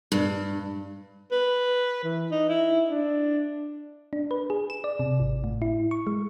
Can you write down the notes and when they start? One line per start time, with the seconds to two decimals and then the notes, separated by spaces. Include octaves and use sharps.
0.12 G2
1.31 B4
2.04 E3
2.31 D#4
2.49 E4
2.90 D4
4.13 D4
4.31 B4
4.50 G#4
4.70 E7
4.84 D5
4.99 C3
5.20 G#1
5.44 A2
5.62 E4
5.91 C#6
6.07 G#3